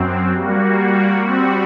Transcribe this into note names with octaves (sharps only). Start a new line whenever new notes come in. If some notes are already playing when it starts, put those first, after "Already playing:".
Already playing: F#2 F#3 C4
G3 A#3 F#4
G3 C4 F#4